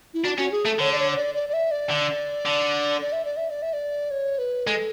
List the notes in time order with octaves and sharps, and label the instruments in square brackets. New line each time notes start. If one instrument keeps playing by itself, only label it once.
[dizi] E4
[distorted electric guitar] D4 [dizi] F#4
[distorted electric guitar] C#4 [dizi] F#4
[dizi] G#4
[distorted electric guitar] A3 [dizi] A4
[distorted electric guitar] D3 [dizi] C#5
[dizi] D5
C#5
C#5
D5
D5
D5
E5
D5
[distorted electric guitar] D3
D3
[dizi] D5
E5
D5
E5
D5
E5
D5
C#5
B4
[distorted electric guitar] G#3 [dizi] A4